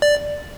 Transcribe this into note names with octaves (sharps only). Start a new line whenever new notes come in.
D5